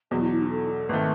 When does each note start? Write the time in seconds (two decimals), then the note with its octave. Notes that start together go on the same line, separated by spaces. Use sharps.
0.11 E2 B2 F#3 G#4
0.21 E4
0.32 E4
0.41 D#4
0.50 A4
0.89 G#1 D#3 A3 B4